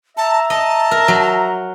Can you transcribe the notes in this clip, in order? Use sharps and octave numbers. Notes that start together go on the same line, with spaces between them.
E5 A5 A#5
D#5 A5
A#4
F#3